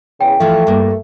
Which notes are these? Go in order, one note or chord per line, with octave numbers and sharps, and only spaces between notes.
E2 C#3 G5
E3 F3 A3
G2 A#3